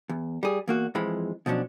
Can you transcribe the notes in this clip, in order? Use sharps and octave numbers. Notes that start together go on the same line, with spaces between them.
E2
G3 G#4
E2 A#3 F#4
F2 E3 F3 G#3 B5
B2 F3 F#3 C#4 D4